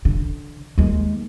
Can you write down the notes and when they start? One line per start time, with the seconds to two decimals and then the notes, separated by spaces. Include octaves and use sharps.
0.05 D3
0.78 D#2 G#3